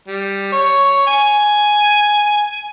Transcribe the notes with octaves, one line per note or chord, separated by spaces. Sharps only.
G3
C#5
G#5